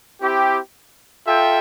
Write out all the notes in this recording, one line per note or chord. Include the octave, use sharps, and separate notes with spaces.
C4 E4 G4
F4 A4 E5 G5